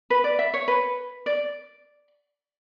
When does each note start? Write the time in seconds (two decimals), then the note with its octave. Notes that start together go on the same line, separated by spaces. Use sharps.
0.10 B4
0.24 D5
0.39 E5
0.54 C#5
0.68 B4
1.26 D5